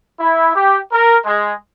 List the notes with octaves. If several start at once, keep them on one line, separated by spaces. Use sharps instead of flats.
E4
G4
A#4
G#3